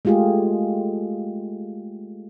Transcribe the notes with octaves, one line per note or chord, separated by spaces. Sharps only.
G#3 A3 F4 G4 G#4